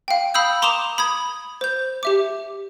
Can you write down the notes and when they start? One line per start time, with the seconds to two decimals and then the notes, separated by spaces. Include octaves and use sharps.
0.08 F5 G5
0.34 F5 B5 D#6 E6 G6
0.62 A#5 C6 D6 D#6 E7 F7
0.98 B5 D#6 G#6
1.61 C5 G6
2.03 G4 E5 D6